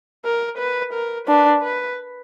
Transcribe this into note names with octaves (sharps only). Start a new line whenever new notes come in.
A#4
B4
A#4
D4 B4
B4